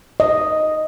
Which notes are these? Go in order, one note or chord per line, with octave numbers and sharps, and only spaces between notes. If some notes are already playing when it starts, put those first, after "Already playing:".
D#5